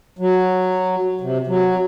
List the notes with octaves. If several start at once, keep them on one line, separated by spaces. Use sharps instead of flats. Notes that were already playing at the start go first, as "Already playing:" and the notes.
F#3
C3
F#3